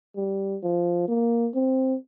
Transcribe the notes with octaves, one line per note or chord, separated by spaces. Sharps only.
G3
F3
A#3
C4